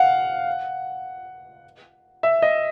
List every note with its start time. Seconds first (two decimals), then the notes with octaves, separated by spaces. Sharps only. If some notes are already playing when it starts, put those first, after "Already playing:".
Already playing: F5 F#5
2.23 E5
2.42 D#5